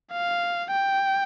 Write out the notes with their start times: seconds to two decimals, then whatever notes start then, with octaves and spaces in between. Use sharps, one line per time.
0.12 F5
0.71 G5